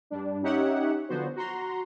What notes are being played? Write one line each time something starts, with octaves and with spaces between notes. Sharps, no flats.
G2 G3 D4
C#4 D#4 G4 C#5 E5 F#5
D3 F3 F#3 B3 F#4 C5
F#4 A#5 C6